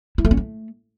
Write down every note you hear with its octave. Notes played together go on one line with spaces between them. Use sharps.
E4
A3
C#4
A3